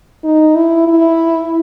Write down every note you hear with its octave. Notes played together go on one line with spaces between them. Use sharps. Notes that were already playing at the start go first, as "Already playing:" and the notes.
D#4
E4
E4